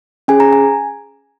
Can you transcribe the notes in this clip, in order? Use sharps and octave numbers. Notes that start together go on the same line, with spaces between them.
C#4 G#4 G#5
A#5
G#5